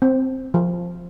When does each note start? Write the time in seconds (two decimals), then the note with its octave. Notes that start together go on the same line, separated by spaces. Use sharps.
0.02 C4
0.54 F3